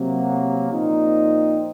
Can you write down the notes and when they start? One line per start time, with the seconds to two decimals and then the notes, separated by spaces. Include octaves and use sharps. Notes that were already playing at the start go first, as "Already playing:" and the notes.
Already playing: C3 F#3 A#3
0.72 A#2 F3 C4 D#4